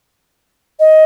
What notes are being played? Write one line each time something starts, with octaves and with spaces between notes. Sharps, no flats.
D#5